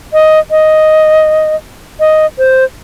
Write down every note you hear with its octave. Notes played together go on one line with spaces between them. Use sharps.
D#5
D#5
D#5
C5